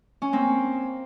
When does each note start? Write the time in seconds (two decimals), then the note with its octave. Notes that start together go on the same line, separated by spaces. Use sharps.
0.22 C#4
0.33 A#3 C4